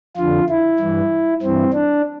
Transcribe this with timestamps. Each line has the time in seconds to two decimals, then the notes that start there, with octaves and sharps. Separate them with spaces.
0.17 F2 D3 F4
0.49 E4
0.79 G2 E3
1.42 G2 E3 C4
1.74 D4